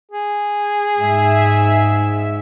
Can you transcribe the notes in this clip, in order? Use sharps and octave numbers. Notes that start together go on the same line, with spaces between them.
G#4
G#2 E5